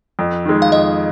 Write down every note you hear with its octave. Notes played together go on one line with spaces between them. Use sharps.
F2
D#3 G#3
F5
F2 D#5